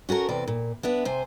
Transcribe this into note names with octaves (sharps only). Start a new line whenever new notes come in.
C#4 F#4 A4 A#4
E2 C3 D5
A#2
B3 D4 E5
C3 C5 G#5